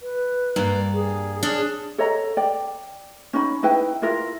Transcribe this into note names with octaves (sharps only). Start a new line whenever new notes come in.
B4
G2 A#3 D5
G#4
C#4 D4
A4 C#5 D#5 A#5
D5 G5
C#4 D#4 B5
D#4 E4 B4 G5
E4 F4 A#4